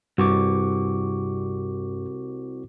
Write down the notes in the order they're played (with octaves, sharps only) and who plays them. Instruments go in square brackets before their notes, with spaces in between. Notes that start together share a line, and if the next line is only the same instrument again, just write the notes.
[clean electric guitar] C2 [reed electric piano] G2 [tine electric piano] F#4 C#6 D6